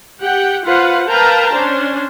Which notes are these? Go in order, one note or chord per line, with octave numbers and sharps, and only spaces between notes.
G4 F#5 G5
F4 B4 C5 F5 F#5
A#4 B4 F5 G5 A5 A#5
C#4 D4 C5